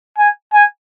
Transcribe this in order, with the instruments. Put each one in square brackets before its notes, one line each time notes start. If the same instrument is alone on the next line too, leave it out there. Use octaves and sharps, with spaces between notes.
[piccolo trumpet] G#5
G#5